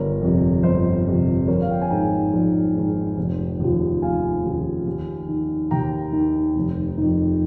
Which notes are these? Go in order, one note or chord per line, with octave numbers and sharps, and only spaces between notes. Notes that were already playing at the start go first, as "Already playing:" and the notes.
Already playing: G1 A#4 C#5
F2 C3
G1 C5 D#5
F2 C3
A#1 A#4 C#5
F5
G5
G#5
G#2 D#3 G5 A#5
A#1
G#2 D#3
F1
D#2 C#3 F3
F1 F5 G#5
D#2 C#3 F3
D#2
D#3
D#2 G5 A#5
D#3
F1
F2 D#3